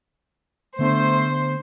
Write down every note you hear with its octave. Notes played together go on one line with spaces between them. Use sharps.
D3 A3 B3 D4 C5